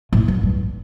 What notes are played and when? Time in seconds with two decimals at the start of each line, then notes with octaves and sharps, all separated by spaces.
0.13 A2
0.28 F#2
0.43 G2